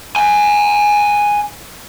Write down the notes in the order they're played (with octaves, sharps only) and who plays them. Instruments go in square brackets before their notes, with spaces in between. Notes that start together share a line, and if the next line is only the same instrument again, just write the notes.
[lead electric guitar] F#5 G#5